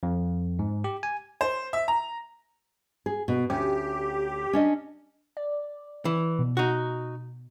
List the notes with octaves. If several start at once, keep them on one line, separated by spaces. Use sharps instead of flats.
F2
G#2
G4
G#5
C5
E5
A#5
G#4
B2
D2 C#4 G4
C#4 D4 D#5
D5
E3
B2
D#4 F#4